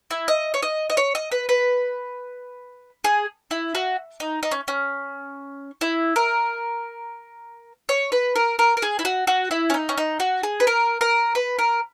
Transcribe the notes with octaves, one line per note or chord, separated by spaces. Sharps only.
E4
D#5
C#5
D#5
D#5
C#5
D#5
B4
B4
G#4
E4
F#4
D#4
D#4
C#4
C#4
E4
A#4
C#5
B4
A#4
A#4
A#4
G#4
E4
F#4
F#4
E4
C#4
D#4
C#4
D#4
F#4
G#4
B4
A#4
A#4
B4
A#4